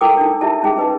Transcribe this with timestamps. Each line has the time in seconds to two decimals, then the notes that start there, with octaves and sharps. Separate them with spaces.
0.01 E4 A4 A#4 G5 D6 D#6
0.17 D4 D#4
0.41 E4 G4 D#5 E5 A5
0.63 C#4 D#4 G#4
0.79 B4 D#5